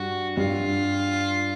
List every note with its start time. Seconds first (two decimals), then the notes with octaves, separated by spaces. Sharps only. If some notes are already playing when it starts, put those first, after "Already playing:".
Already playing: G2 G3 F#4
0.37 G2 G3 F4